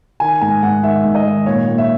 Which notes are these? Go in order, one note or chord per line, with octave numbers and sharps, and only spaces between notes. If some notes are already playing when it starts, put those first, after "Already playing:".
D#3 G#5
G#2 G#5
G#2 F#5
D#3 E5
G#2
D#5
D#3
A#2 C#5
A#2
E5